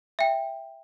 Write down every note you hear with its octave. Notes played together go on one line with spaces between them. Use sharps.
E5 G5